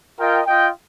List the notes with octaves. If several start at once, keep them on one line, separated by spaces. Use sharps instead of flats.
F4 A#4 D#5 G5
F4 D#5 G5